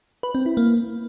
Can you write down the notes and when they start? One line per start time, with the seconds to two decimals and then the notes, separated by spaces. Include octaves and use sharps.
0.23 B4
0.35 C4
0.46 E4
0.57 A#3